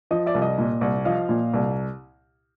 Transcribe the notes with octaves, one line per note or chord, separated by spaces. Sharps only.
F3 D#5
D5 E5
C2
D#5
A#2
C2
F3 D#5 F5
A#2
C2